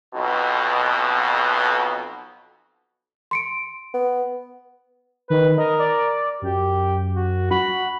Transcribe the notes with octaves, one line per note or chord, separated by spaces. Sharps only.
B1 F2 B2
C6 C#7 D7
B3
D#3 B4
A#4 D#5
D5
F#2 G4
F#4
F#4 B5